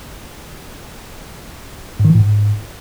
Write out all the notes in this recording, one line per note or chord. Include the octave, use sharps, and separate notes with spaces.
G#2
D#3
E3
A2
G#2